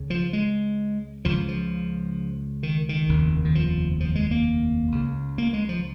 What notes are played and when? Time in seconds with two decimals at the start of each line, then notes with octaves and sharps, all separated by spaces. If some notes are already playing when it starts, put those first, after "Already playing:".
Already playing: C#2 C#3
0.10 F3
0.33 G#3
1.25 C#2 C#3 F3
1.48 F3
2.63 D#3
2.89 D#3
3.09 F1 D#2 C#3
3.45 D#3
3.55 F3
4.00 F3
4.15 G#3
4.31 A#3
4.92 C#2 C#3
5.38 A#3
5.53 G#3
5.69 F3